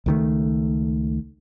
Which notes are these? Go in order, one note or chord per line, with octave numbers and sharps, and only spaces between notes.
C#2 D#3 A3